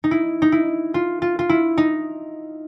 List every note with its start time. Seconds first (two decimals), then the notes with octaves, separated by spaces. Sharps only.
0.04 D#4
0.11 E4
0.42 D#4
0.52 E4
0.94 F4
1.22 F4
1.39 F4
1.49 E4
1.78 D#4